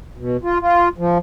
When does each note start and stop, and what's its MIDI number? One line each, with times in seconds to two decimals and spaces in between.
0.17 0.37 47
0.43 0.58 65
0.61 0.89 65
0.98 1.18 53